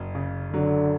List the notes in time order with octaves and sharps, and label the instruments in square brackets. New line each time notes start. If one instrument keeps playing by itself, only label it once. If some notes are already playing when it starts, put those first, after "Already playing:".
Already playing: [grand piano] F#1
C#3
[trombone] D3 [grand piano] F#3